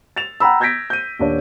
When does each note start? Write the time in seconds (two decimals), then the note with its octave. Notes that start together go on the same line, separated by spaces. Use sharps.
0.16 A6 E7 F7
0.40 F#5 G5 A#5 B5 E6
0.60 E6 G6 G#6 A#6 B6 D7
0.90 G6 D#7
1.19 D#1 D4 C#5